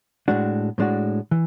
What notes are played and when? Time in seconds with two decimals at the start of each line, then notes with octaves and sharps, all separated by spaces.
0.28 A2 G#3 D4 F#4
0.78 A2 G#3 D4 F#4
1.31 E3